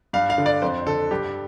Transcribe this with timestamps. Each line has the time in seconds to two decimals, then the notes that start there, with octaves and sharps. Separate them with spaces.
0.13 G2 F5
0.30 F5
0.38 D3
0.46 D5
0.62 F2 C5
0.86 D3 A4
1.11 G2 G4